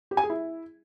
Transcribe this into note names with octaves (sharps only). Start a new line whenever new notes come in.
G4
G#5
G#4
E4